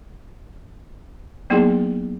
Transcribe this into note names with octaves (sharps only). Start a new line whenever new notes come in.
F#3 A#3 B3 D#4 E4 G#4